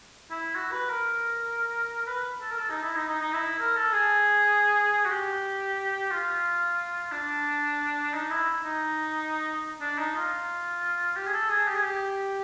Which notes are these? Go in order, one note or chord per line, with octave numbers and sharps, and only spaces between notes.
E4
F#4
B4
A#4
B4
A4
A#4
A4
D#4
E4
D#4
D#4
D#4
E4
A#4
A4
G#4
F#4
G4
F4
D4
D#4
E4
D#4
D4
D#4
F4
G4
G#4
A4
G#4
G4
G#4
G4